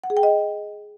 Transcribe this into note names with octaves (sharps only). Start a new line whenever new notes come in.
F#5
G#4
G5
D#5